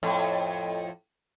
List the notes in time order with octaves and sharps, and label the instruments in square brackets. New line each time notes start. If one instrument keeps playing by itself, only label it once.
[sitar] F2 A2